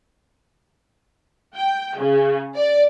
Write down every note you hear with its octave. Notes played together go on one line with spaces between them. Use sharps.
G5
C#3
D5